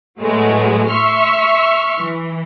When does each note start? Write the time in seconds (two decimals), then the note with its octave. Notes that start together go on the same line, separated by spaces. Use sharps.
0.21 A2 F#3 G#3 A3 B3
0.90 E5 C6 C#6 F6
2.00 E3